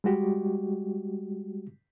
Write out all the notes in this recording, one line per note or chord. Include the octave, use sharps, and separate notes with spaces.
G3 G#3 F#4 G4